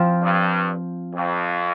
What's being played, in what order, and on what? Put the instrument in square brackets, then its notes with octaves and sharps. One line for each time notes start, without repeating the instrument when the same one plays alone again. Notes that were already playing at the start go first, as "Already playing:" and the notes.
Already playing: [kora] F3 C4 F4
[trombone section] G2
F2